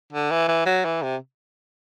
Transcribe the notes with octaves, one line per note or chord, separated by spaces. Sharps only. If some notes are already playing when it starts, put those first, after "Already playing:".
D3
E3
E3
F#3
E3
C3